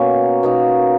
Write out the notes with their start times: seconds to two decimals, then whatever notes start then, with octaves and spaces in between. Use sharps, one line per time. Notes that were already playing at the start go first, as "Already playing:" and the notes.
Already playing: B2 A#3 C#4
0.43 B2 A#3 D#4